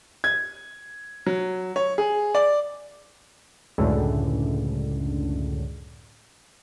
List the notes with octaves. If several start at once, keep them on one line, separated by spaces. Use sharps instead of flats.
G#6
F#3
C#5
G#4
D5
C#2 F#2 A2 D3